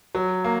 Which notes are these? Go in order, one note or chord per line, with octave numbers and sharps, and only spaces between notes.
F#3
A#3